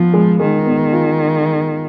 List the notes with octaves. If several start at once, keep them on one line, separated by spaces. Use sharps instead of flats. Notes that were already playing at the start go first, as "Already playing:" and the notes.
Already playing: F3 B3 F4
G#3
D#3 G#3
B3
F4